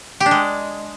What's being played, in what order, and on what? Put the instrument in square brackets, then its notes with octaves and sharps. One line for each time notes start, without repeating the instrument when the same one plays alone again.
[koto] G4
D4
G#3